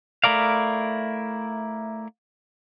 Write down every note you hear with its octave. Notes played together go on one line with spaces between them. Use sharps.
A3 E4 A#4 D5 F5